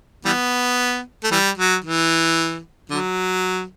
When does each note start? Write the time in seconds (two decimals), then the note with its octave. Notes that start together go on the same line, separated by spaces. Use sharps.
0.25 E3 G3 B3
1.23 A3
1.31 E3 G3
1.57 F#3
1.84 E3
2.90 D3 F#3